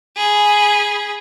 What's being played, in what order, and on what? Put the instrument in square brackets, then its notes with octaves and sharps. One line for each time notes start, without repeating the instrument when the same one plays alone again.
[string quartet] G#4 B5